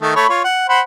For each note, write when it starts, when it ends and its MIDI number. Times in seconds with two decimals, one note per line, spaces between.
0.02 0.13 51
0.02 0.13 57
0.16 0.28 57
0.16 0.28 73
0.16 0.28 83
0.29 0.42 65
0.29 0.42 73
0.44 0.65 78
0.69 0.81 72
0.69 0.81 78
0.69 0.81 83